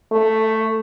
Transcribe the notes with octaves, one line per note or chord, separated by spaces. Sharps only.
A3